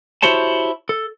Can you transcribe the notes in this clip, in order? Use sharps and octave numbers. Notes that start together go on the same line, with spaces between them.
E4 F#4 G4 C5 C#5 A5
A4